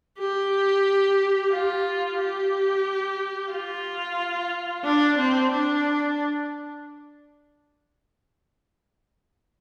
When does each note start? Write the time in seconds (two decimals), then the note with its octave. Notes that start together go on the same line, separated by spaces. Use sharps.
0.19 G4
1.52 F4
2.18 G4
3.52 F4
4.84 D4
5.18 C4
5.51 D4